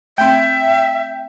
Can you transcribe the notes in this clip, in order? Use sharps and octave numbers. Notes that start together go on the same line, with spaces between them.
A3 C4 E5 G5